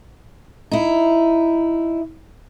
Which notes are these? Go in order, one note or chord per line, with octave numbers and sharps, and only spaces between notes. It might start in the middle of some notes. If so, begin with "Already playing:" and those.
D#4 E4